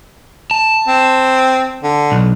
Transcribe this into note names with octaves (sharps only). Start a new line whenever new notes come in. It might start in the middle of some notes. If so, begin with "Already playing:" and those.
A5
C4
D3
B1